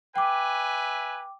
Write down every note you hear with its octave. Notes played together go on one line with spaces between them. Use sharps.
B4 E5 G5 G#5 D6